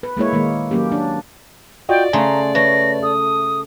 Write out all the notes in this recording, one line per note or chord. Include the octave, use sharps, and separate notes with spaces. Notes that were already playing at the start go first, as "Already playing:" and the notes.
B4
G#3 A#3 E4 C#5
D#3 G#3 A#3
F#3 A#3 C#4 G4
D4
F4 F#4 D5 D#5 G5
C#3 A3 G#5 A#5 C6
A3 B4 C#5 A#6
A4 D#6